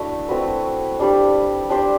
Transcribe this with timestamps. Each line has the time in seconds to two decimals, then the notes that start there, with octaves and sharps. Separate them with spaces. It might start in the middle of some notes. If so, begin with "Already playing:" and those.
Already playing: A3 D4 E4 F#4 B4
0.29 A3 C4 F#4 B4
1.00 G3 D4 G4 D5
1.70 D4 G4 C5